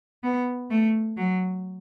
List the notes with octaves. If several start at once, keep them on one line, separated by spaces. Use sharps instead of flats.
B3
A3
F#3